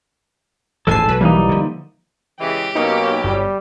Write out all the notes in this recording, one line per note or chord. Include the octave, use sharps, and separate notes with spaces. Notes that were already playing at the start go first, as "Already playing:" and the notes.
D#1 A1 G#2 F3 A4 G#5 A5 C7
B1 F#3 B4
E3 G3 A#3 D#4
D3 F3
C#3 E3 G#3 G4
B2 F#3 A#3 C#4 D#4
G1 G3